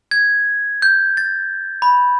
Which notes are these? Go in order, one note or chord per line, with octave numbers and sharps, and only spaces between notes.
G#6
G6
A6
B5